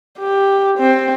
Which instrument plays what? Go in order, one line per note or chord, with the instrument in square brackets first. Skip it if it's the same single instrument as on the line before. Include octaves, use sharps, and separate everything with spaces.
[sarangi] G4
C4